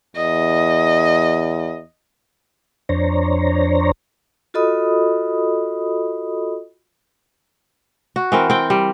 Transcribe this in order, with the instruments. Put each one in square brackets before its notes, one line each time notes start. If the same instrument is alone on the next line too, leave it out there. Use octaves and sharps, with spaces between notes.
[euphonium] E2 [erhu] D#5
[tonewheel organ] F2 D4 C5 C#5 A#5
[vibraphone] F4 F#4 A4 D#5 B5 D#6
[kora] F#4
E3 C4 A#4
C4 G5
G3